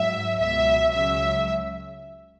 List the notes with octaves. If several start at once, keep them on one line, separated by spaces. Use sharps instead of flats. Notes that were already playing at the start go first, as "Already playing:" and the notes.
Already playing: G#2 F#3 E5
C#2 B2 F#3 E5
C#2 C#3 F#3 E5